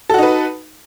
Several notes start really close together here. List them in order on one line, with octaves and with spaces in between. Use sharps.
A4 F#4 D#4 B4